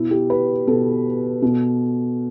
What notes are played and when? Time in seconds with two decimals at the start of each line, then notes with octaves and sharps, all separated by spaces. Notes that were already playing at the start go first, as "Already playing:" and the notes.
Already playing: B2 E4
0.11 G4
0.30 B4
0.67 B2 A4
1.42 B2